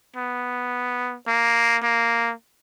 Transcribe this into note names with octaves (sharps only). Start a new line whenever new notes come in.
B3
A#3
A#3